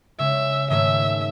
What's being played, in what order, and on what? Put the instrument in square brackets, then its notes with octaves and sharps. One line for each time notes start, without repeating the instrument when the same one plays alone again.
[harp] C#3 G#3 C#4 [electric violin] E5
[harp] G#2 D#3 A3 C#4 G#4 [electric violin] E5